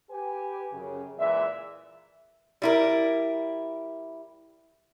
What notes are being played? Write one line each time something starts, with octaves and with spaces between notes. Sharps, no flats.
G4 B4 G#5
F#2 C#3
A#2 E3 G#3 D5 E5
G3 E4 A#4